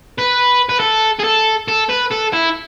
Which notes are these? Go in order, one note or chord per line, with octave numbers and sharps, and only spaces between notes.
B4
B4
A4
G#4
A4
A4
B4
A4
E4